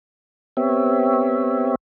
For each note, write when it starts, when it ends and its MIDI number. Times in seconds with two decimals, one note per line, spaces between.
0.57 1.75 59
0.57 1.75 60
0.57 1.75 67
0.57 1.75 73
0.57 1.75 76